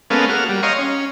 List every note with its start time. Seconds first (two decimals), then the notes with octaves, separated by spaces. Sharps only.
0.10 G#3 A#3 B3 C#4 A4 F5
0.29 A#3 F#4 F6
0.49 G3
0.63 C#5 D#5 F5 A#5 C6
0.79 C#4